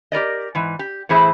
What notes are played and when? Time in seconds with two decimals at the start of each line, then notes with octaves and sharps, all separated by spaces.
0.12 G4 A#4 D5 D#5
0.55 G#2 E3
0.79 G4
1.09 A2 E3 E4 G#4 C5